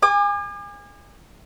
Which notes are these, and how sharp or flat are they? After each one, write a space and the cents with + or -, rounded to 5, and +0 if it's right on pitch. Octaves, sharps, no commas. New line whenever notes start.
G#5 -30 D6 +40